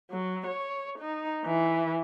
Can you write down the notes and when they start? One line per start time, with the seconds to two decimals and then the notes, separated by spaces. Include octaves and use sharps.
0.11 F#3
0.48 C#5
0.99 D#4
1.45 E3